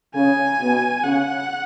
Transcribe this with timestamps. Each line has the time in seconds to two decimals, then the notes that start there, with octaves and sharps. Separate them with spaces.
0.15 C#3 G#5
0.60 B2
1.04 C#3 F#5